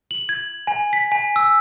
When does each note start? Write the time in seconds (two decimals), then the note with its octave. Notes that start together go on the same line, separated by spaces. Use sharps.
0.11 F#7
0.29 G#6
0.67 G#5
0.93 B6
1.12 G#5
1.36 E6